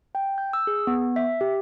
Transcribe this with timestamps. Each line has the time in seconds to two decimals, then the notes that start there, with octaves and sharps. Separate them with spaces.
0.15 G5
0.38 G6
0.53 E6
0.67 G#4
0.87 B3
1.16 E5
1.41 G4